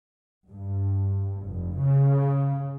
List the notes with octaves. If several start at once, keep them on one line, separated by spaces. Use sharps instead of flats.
G2
F1
C#3